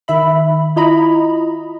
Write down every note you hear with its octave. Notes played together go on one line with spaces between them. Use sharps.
D#3 E5 B5
E4 F4 D#5 A#5 B5